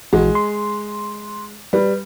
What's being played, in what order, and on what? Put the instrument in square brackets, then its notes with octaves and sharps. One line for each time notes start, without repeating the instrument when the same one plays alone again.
[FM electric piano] A#1 E3 F#4 [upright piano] G#3
[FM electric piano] C6
[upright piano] G3 [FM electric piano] B4